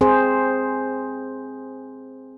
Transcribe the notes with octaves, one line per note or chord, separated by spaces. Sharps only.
C4 G#4 C5